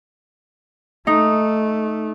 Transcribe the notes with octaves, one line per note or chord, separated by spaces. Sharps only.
A3 D#4